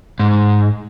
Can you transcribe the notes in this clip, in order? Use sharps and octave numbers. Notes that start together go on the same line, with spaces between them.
G#2